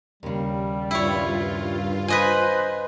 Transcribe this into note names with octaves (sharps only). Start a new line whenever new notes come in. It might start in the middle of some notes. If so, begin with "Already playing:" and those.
D#2 C#3 G3
G2 E4 F4 C#5
B4 C5 D#5 G#5